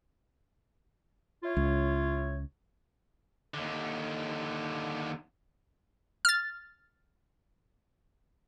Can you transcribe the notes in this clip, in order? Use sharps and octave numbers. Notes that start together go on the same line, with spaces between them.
E4 F4 C#5
C#2
D#2 D3
F6 A6